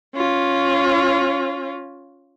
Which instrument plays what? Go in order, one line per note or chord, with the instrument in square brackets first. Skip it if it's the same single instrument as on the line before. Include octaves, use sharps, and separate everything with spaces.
[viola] C#4 F4